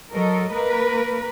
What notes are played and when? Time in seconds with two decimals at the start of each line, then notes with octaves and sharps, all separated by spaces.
0.12 F#3 A4 A#4 D#5
0.52 A#3 A#4 B4